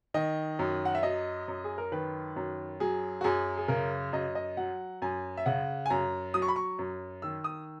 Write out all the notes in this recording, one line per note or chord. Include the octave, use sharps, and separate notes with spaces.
D#3 D#5
F#2
F#5
E5
F#3 D#5
F#2
G#4
A#4
D#3 B4
F#2
F#3 G#4
F#4
F#2 G#4
G#4
C#3 A#4
F#2 D#5
D#5
F#3 F#5
F#2 G#5
E5
C#3 F#5
G#5
F#2 A#5
F#3 D#6
C#6
B5
C#6
F#2
D#3 E6
D#6